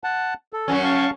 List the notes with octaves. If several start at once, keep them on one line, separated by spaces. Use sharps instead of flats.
F#5 A5
A4
F#2 F#3 C#4
F5 A5 C#6